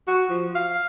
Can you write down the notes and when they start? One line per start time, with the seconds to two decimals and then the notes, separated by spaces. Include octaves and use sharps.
0.07 F#4
0.30 F3
0.55 F5